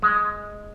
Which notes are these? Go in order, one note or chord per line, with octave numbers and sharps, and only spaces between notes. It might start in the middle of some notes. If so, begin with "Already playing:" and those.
G#3